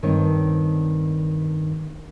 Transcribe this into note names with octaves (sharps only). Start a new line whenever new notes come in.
G2 D#3 C4 C#5